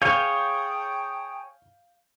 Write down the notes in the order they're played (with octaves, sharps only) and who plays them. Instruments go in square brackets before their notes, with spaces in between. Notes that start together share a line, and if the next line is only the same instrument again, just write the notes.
[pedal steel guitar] G#4 C#5 [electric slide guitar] F5 [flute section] G5 A5 D#6 [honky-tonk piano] G6